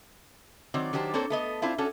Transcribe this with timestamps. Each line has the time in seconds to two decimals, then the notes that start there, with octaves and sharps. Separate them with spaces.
0.74 D#3 F#3 C4 D5
0.93 D#3 F#3 D4 G4 C5
1.14 A#3 C4 D4 A4 C#5
1.30 A3 B3 D#5
1.62 C4 D4 E4 F4
1.78 C#4 D4 F#4 A4